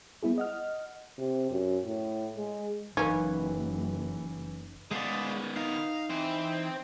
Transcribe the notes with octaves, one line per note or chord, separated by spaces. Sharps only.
G3 B3 E4 G#4
D#5 F#5 F6
C3
F#2
A2
G#3
F#1 E3 A#3 C#4 D#4 B4
D#3 G#3 B3 G#4 D5 F5
D#4 F5
E3 C4